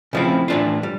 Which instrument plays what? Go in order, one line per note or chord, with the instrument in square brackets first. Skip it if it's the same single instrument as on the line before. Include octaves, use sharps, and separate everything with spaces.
[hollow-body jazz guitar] C#3 F3 A3 C4 E4
A2 E3 A3 D4 F4
G3